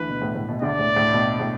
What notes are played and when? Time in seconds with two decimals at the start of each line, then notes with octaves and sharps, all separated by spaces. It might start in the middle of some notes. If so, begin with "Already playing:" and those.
Already playing: D2 D3 E3 B4
0.09 B2
0.22 A2
0.35 A2
0.48 B2
0.62 D2 D3 D5
0.79 A2
0.96 A2
1.13 B2
1.40 A2